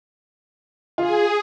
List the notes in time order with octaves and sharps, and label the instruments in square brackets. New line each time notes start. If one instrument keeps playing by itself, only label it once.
[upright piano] F4 [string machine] G#4